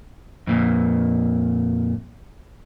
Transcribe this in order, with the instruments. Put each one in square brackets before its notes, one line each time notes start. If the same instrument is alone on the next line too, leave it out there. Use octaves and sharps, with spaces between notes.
[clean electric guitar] F2 A#2